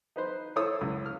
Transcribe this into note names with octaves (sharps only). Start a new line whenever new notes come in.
D#4 B4 C5
E4 A4 C5 C#5 D#6 E6
C#2
F6